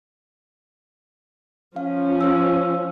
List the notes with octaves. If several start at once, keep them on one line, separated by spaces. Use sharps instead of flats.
F3 C#4 F5
C5 F5 E6